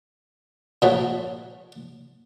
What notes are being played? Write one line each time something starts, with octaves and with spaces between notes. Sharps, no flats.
A#2 F3 F#3 A3